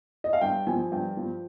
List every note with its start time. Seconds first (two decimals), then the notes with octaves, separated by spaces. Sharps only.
0.24 D#5
0.33 F5
0.41 G2 G5
0.67 F3 G#5
0.92 G2 G5
1.17 F3